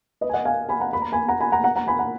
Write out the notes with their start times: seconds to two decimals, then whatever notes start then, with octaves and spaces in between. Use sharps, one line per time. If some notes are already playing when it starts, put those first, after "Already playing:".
0.21 B4 D#5
0.29 G#5
0.33 D#5 F#5
0.45 F5 G#5
0.69 G#5 B5
0.80 F#5 A#5
0.93 B5
1.02 A#5
1.12 G#5 B5
1.28 F#5 A#5
1.40 G#5 B5
1.52 F#5 A#5
1.64 F#5 A#5
1.76 F#5 A#5
1.87 G#5 B5
1.99 F#5 A#5